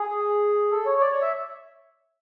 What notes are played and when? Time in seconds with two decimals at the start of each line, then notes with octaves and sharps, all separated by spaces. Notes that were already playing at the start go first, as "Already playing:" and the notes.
Already playing: G#4
0.71 A4
0.86 C#5
1.01 D5
1.12 C#5
1.22 E5